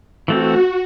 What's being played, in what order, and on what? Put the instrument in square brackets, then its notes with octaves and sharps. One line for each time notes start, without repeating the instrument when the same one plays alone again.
[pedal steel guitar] E3 A3 C4 [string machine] F#4